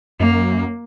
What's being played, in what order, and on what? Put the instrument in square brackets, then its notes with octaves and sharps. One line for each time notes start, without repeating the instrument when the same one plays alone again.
[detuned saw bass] F#2 [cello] A#3